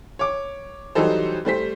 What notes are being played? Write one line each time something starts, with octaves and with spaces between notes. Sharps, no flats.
C#5 D6
E3 F#3 G3 D#4 A4 C5
G3 A3 C5 B6